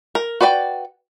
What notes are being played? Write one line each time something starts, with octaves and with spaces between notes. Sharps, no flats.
A#4
F#4 B4 D5 D#5 G5